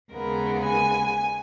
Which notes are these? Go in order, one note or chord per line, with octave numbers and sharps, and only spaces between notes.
D#2 C#3 G#3 B3 A#4
G#5